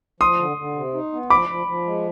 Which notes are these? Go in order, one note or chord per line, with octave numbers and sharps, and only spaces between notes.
F3 C6 D#6
D3
D3
C3
D#4
B3
F3 B5 D6
F3
F3
G#3